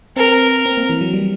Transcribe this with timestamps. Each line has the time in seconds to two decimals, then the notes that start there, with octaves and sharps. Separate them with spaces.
0.16 C4 A#4
0.66 C4
0.77 A#3
0.89 E3
1.01 F#3
1.13 G3